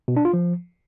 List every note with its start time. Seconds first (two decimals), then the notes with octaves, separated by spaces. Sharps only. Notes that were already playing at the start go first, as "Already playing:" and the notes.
0.08 B2
0.17 D4
0.25 F4
0.33 F3